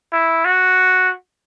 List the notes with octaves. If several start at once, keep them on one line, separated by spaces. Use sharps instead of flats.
E4
F#4